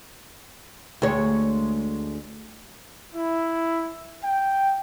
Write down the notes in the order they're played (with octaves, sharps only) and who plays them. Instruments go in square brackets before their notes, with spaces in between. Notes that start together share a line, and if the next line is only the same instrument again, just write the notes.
[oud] D2 G#3 C#5
[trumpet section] E4
G5